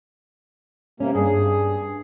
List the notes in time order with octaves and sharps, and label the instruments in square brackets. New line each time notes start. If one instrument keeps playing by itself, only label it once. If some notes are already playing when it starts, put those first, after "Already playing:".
[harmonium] C3 A#3 [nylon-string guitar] C#4
[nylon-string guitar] G2 [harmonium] G#4